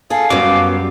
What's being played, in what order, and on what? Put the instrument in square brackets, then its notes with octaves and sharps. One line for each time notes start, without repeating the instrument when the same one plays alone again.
[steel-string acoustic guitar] G#4 A4 [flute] F5
[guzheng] F#2 G3 [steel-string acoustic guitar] F#3 B3 [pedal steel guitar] D6